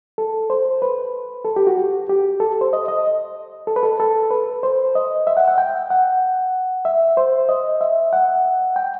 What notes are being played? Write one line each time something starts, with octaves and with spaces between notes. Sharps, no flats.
A4
C5
B4
A4
G4
F#4
G4
G4
A4
C5
D#5
D#5
A4
B4
A4
A4
B4
C5
D#5
E5
F#5
F#5
G5
F#5
E5
C5
D#5
E5
F#5
G5